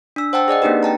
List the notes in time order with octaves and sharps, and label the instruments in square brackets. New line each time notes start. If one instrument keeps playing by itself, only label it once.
[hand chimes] D4 E6
C5 F#5 G5 A5 E6
G#4 D5 D#5 F#5
A#3 C4 D4 D#4 G4 B4
G5 A5 A#5